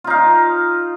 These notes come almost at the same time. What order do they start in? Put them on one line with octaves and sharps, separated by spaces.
F4 D#4 F5